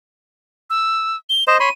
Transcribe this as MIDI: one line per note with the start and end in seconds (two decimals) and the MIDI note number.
0.70 1.16 88
1.30 1.44 103
1.47 1.58 72
1.47 1.58 75
1.47 1.58 100
1.60 1.69 73
1.60 1.69 83
1.60 1.69 84
1.60 1.72 99